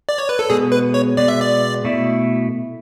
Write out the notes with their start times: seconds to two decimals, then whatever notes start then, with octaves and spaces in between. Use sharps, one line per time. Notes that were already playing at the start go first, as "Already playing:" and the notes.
0.09 D5
0.18 C#5
0.29 B4
0.39 A4
0.49 B2 G#3 B3 G#4
0.72 B4
0.94 C#5
1.17 B2 G#3 B3 D5
1.28 E5
1.41 D5
1.84 B2 A3 E4